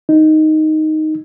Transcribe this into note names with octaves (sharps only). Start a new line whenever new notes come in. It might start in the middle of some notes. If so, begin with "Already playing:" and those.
D#4